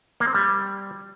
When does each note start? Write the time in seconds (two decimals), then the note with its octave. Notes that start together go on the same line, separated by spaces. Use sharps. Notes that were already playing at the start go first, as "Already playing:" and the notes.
0.20 A#3
0.27 C4
0.34 G3